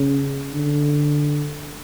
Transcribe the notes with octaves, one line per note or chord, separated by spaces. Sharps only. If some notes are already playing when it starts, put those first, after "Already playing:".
Already playing: C#3
D3